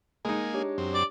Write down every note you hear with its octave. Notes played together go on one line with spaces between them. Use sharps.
G#3 A#3 D#4 G#4 A#5
D4 G4 C#5
F#2 C4
D5